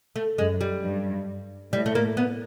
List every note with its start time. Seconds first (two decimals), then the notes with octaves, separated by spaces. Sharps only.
0.16 A3
0.38 F#2 G#3
0.61 G3
0.83 G2
1.72 A2 G3
1.86 A3
1.95 A#3
2.17 B3